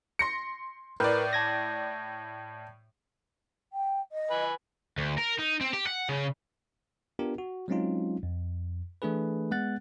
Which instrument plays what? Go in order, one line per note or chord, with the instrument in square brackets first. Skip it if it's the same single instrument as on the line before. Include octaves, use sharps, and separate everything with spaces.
[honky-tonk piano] C6 A#6 C#7
[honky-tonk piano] A2 D5 [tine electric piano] A#4 B4
[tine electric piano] A5 G#6 A#6
[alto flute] G5
D#5
[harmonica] B4 G#5
[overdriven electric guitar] D2
A#4
D#4
C4
G4
F#5
C#3
[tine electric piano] B3 D4 F4 G4 A#4
F#4
F#3 G#3 C4 C#4 D#4 F4
F2
E3 A3 D4 G#4 B4
G#3 B3 F#5 F#6 A6